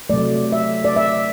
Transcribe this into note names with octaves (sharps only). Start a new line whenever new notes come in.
C3 F#3 A3 D5
E5
D5
E5